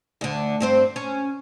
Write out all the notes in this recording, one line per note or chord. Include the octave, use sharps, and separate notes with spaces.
D2 D3
G2 C4 C5
C#4